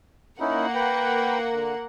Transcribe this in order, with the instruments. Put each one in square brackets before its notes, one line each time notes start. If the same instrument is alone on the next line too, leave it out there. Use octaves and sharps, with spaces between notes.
[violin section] A#3 F#5 [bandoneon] C#4 D#4 E4
[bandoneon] B4 G5
D3